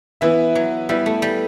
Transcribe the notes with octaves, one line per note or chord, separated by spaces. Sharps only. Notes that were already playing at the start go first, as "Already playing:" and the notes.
E3 B3 E4 B4 E5
F#3
G3 B3 E4 B4 E5
A3
G3